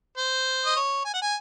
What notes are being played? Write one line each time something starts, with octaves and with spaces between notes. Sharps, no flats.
C5
D#5
C#5
G#5
F#5
G#5